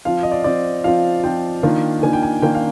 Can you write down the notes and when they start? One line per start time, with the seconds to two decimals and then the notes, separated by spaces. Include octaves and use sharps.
0.05 F3 C4 F4 F5
0.23 D#5
0.32 D5
0.44 F3 C4 F4 D5
0.84 F3 C4 F4 F5
1.24 F3 C4 F4 G5
1.63 D#3 A#3 D4 F4
2.02 D#3 A#3 D4 F4 G#5
2.13 G5
2.23 G#5
2.42 D#3 A#3 D4 F4 G5
2.55 F5